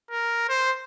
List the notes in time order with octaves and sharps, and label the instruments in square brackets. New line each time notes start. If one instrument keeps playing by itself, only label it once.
[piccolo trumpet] A#4
C5